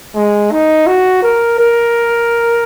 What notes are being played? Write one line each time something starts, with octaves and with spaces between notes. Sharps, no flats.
G#3
D#4
F#4
A#4
A#4